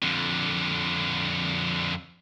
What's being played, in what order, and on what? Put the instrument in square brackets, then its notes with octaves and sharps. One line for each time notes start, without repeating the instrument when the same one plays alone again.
[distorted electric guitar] F2 D3